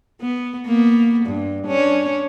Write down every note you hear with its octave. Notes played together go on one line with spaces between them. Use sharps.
B3
A#3 B3
G2
C#4 D4